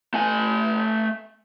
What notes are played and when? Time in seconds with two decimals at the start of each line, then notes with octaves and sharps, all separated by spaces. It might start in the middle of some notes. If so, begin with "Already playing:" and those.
0.14 A3 G#5